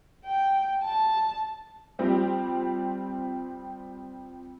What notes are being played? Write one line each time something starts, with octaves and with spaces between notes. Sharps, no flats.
G5
A5
F3 G3 C4 G4